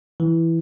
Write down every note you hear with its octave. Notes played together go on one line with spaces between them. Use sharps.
E3